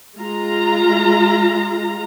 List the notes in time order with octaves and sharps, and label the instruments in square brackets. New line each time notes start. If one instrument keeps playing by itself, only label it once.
[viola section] G#3 F4 A#5